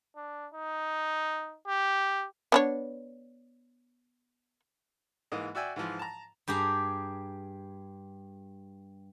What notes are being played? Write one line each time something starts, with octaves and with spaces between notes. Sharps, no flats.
D4
D#4
G4
B3 D4 C#5
G#2 E3 A#3 D#5
F#4 D5 E5 G5 G#5
G#2 E3 F3
A5 A#5
G2 G4 G#4 A#5